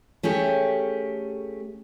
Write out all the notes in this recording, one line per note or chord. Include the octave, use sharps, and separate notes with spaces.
A3 C#4 G4 G#4